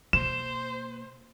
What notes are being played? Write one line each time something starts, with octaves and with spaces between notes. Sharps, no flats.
B2 A#3 C5 E7